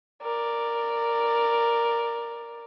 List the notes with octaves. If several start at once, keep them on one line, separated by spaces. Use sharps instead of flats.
A#4 D5